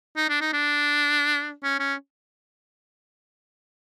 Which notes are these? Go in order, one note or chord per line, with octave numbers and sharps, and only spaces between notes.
D#4
D4
D#4
D4
C#4
C#4